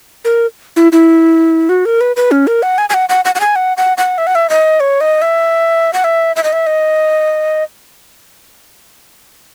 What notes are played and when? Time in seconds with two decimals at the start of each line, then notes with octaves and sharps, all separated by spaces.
0.25 A#4
0.76 E4
0.92 E4
1.69 F#4
1.85 A#4
2.01 B4
2.16 B4
2.31 C#4
2.47 A#4
2.63 F#5
2.78 G#5
2.90 G#5
2.94 F#5
3.09 F#5
3.25 F#5
3.35 F#5
3.40 G#5
3.56 F#5
3.77 F#5
3.98 F#5
4.18 E5
4.27 F#5
4.35 E5
4.50 D#5
4.80 C#5
5.01 D#5
5.22 E5
5.93 F#5
6.04 E5
6.36 E5
6.44 D#5
6.53 E5
6.67 D#5